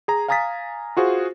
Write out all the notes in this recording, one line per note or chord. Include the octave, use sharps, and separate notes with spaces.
G#4 A#5
F5 G#5 A#5 D#6 A6 B6
F4 F#4 G#4 C5